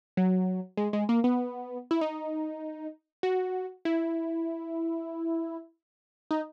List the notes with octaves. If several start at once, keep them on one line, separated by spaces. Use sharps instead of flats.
F#3
G#3
G#3
A#3
B3
E4
D#4
F#4
E4
D#4